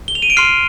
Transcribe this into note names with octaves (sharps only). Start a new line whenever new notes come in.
G7
F7
D#7
D7
C6 F6 C7